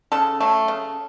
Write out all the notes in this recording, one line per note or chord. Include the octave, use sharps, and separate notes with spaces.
C#3 A4
F#3 A3
C#3